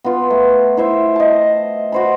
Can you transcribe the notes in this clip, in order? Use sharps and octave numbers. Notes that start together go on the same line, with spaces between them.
B3 F4
A3
E4 C5 E5
D#5 A5
F#4 C5 B5